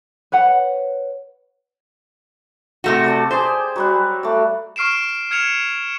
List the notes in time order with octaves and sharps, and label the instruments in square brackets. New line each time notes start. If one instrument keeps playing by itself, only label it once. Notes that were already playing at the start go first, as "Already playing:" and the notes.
[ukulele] B4 C#5 F#5
[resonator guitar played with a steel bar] C3 A3 F#4
[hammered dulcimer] C5 D5 A5
[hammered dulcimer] G4 G#4 [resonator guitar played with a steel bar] C5
[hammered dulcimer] F#3 G3 F#5
A3 D5
[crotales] C#6 F6 C7 D7 E7
F6 G#6 C#7 E7 F7